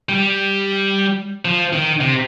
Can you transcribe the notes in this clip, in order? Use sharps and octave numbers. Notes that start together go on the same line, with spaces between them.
G3
F3
D#3
C3